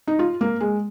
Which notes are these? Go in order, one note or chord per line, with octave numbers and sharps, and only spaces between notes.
D#4
F4
A#3
G#3